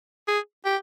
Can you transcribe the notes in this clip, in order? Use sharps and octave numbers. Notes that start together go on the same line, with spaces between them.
G#4
G4